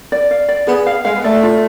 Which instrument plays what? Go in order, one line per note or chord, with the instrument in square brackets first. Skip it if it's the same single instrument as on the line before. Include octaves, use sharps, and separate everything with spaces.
[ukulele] D5
F5
D5
[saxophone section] B3 [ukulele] G#4
[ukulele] F5
[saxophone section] G#3 [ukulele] F5
[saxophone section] B3
[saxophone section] A3 [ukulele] D5
[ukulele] F4